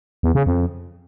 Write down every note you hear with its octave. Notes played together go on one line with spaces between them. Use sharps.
E2
C#3
F2